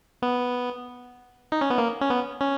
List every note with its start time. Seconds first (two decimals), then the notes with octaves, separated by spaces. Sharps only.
0.22 B3
1.52 D#4
1.61 C#4
1.70 B3
1.78 A#3
2.01 C#4
2.10 B3
2.41 C#4